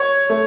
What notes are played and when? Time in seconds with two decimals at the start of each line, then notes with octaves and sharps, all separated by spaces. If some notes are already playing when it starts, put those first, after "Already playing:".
Already playing: C#5
0.30 A3